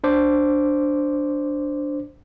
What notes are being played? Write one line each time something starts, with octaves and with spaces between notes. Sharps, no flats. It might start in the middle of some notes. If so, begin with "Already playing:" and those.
D4 C5 D6